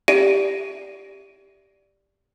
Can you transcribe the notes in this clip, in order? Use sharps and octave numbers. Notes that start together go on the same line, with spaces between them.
G4 D5 E5 D7 D#7